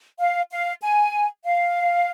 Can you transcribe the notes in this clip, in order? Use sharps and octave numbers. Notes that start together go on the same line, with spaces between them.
F5
F5
G#5
F5